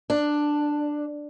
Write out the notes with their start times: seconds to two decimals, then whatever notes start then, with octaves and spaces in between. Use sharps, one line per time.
0.10 D4